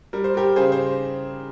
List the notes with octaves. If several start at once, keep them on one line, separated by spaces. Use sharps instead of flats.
G3 A#4
C5
G3 G4 A#4
C#3 G#4 C5
C5